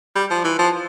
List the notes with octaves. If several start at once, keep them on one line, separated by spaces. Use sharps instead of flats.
G3
F3
E3
F3